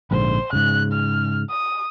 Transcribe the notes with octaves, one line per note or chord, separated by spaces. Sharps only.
A#1 G#2 D3 C5
G#2 C#3 F#6
F6
D#6